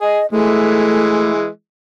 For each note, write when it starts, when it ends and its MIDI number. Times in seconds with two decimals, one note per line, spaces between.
0.01 0.20 68
0.01 0.26 75
0.31 1.48 52
0.31 1.48 56
0.31 1.31 57